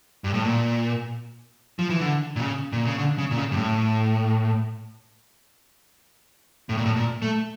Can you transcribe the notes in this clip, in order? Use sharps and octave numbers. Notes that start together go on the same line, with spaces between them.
G2
A2
A#2
F3
E3
D3
A#2
C#3
A#2
C#3
D3
C#3
A#2
C#3
G2
A2
A2
A#2
A2
A#2
A3